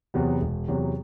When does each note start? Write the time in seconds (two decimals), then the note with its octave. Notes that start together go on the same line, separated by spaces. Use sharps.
0.14 E2 C3 F#3 B3
0.41 E1
0.68 E2 C3 F#3 B3